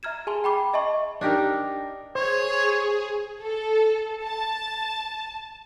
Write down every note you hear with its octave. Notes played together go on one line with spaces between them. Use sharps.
E5 A#5 F6 G#6 E7
G#4 G#5 A5 C6 G7
G5 B5 D6 C7
D#5 E5 A5 C6 C#6
D4 D#4 G4 A#4
G#4 C5 C#5
A4
A5